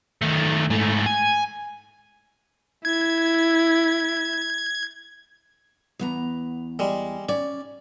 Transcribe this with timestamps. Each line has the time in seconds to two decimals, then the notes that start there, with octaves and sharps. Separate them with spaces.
0.22 D#3 A3
0.70 G#2 A3
1.06 G#5
2.85 E4 G#6
5.99 E2 B3 A#5
6.79 G3 G#3
7.29 C#4 D5